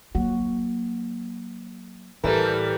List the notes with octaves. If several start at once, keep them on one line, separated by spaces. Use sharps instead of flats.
F#3 A#3 F#4
A2 E3 G3 A4 A#4